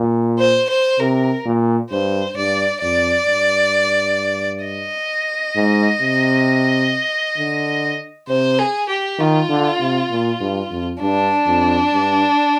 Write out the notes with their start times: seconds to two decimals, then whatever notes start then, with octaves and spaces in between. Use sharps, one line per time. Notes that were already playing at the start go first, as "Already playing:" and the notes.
Already playing: A#2
0.39 C5
0.70 C5
1.00 C3 A#4
1.46 A#2
1.91 G2 C5
2.37 G2 D5
2.82 F2 D5
3.27 G2
4.65 D#5
5.56 G#2
6.01 C3
7.38 D3
8.28 C3 C5
8.59 G#4
8.89 G4
9.19 D#3 F4
9.50 D3
9.80 C3
10.11 A#2
10.41 G2
10.71 F2
11.01 G2 D4
11.47 F2
11.93 G2